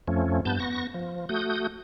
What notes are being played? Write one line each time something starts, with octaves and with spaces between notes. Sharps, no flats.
F2 F3 A3 C#4
G2 B3 A5 G6
B3 C#6 A#6
F3
A3 F#4 D#6 G6